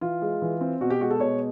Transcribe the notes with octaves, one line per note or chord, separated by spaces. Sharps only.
E3 F4
G#3
E3
C4
B2 F#4
G4
G#3 F#4
A4
B2 C#5